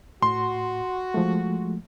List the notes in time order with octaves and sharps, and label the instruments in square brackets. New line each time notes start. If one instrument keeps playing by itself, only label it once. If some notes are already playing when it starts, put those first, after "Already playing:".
[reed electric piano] A2 [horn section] F#4 [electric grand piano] C6
[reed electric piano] F3 G#3 A3